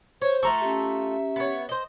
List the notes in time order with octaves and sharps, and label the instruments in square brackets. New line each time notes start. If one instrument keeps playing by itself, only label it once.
[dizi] C5 [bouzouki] C#5
[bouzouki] A3 F4 A4 [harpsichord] A#5 C#6
[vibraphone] C#4 G4 [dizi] E5
[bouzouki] B3 C#5
C5 D#5